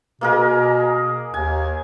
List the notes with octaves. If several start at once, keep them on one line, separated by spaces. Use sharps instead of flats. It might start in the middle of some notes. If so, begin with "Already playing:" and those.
B2 A#3 G#4 A#4
D#2 G#5